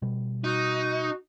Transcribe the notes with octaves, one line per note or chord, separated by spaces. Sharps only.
B2 G3
D#4 F#4